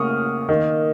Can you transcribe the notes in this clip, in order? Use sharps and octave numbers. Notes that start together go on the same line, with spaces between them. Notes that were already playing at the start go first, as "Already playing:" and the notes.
Already playing: C#3 A#3 C#6 D#6 F6
D#3 A#3